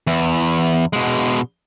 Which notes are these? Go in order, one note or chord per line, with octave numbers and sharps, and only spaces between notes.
E2
B2 G#3